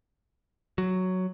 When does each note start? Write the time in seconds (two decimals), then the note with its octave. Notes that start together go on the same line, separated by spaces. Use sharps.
0.78 F#3